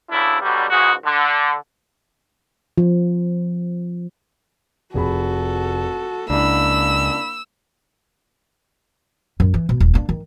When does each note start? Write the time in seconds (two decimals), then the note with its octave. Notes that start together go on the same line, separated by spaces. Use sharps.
0.11 D2 C#3 D4 E4
0.42 B2 D3 F#3 G3
0.70 C#2 G#2 C#3 F#4 G#4
1.04 D3
2.78 F3
4.94 F1 F#4 G#4 A4 B5
6.30 C#2 A#3 D4 E4 B5 E6
9.40 F#2
9.54 E3
9.69 B2
9.80 D#1
9.94 A#3 D4
10.09 D#3